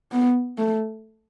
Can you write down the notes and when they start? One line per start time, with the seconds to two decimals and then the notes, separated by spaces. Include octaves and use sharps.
0.12 B3
0.58 A3